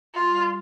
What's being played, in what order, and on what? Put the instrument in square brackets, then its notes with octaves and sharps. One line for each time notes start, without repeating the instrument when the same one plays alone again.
[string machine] G3 [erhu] F4